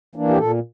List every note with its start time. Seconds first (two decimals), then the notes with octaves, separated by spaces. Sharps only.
0.15 E3 A#3 D4
0.29 G4
0.37 A#2 A4